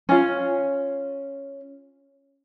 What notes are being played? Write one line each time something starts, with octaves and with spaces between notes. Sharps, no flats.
C#4 F4